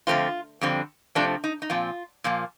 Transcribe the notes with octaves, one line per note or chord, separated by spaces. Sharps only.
D3 F3 A3 C4 F4
F2 D3 G3 C4
C3 F3 A3 C4 D4
D#4
D#4
A#2 F3 C4 F4
A#2 F3 A#3